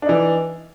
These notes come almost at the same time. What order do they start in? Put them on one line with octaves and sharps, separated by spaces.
D4 D#4 E3